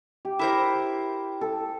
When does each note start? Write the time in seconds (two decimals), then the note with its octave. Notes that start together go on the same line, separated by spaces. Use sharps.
0.25 G4
0.39 E4 A#4 C5
1.41 A4